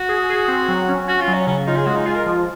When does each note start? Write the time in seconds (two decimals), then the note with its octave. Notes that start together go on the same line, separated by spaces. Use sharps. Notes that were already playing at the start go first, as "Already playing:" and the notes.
Already playing: F#4
0.09 G#4
0.30 G#4
0.48 C4
0.68 F#3
0.88 C#4
1.08 C#4 F#4
1.21 F4
1.28 F#3
1.34 C#4
1.47 C#3 C#4
1.67 D#4 F4
1.77 G#4
1.86 G#3 F#4
1.96 D#4
2.06 F4 G#4
2.15 A#4
2.26 F3